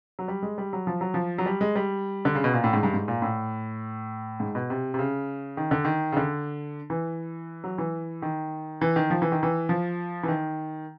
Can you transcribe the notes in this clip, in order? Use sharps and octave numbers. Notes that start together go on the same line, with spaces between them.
F#3
G3
G#3
G3
F#3
F3
F#3
F3
F#3
G3
G#3
G3
D3
C#3
B2
A#2
A2
G#2
G2
G#2
A#2
A2
G#2
B2
C3
C3
C#3
D#3
D3
D#3
C#3
D3
E3
F#3
E3
D#3
E3
D#3
F3
E3
D#3
E3
F3
E3
D#3